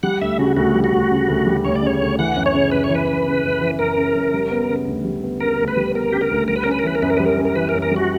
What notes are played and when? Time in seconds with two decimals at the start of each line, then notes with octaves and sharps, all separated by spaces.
0.03 G3 F#5
0.21 D2 E5
0.39 C#3 F#4
0.56 D2 F#4
0.75 G3
0.84 F#4
0.92 D2
1.11 C#3
1.28 D2
1.47 G3
1.65 D2 C#5
1.75 D5
1.82 C#3 C#5
2.00 D2
2.19 E3 F#5
2.36 F#2
2.46 C#5
2.54 C#3
2.72 F#2 B4
2.84 C#5
2.90 E3 B4
3.08 F#2
3.26 C#3
3.44 F#2
3.61 E3
3.79 F#2 A#4
3.97 C#3
4.16 F#2
4.34 G3
4.51 B3
4.70 C#3
4.87 D2
5.05 G3
5.24 B3
5.40 C#3 A#4
5.59 D2
5.68 B4
5.77 G3
5.94 B3 A#4
6.12 C#3 G4
6.21 A#4
6.31 D2
6.48 G3 A#4
6.56 B4
6.64 C#4 A#4
6.71 B4
6.79 A#4
6.84 E3 B4
6.95 A#4
7.02 F#2 B4
7.10 A#4
7.17 B4
7.20 G3
7.26 A#4
7.37 C#4
7.45 A#4
7.56 E3 B4
7.69 A#4
7.74 F#2
7.82 A#4
7.92 G3 F#4